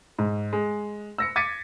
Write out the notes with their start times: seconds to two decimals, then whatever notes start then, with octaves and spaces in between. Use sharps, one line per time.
0.18 G#2
0.53 G#3
1.18 E6 A#6 C#7
1.36 D6 G#6 A6 B6 C#7 D#7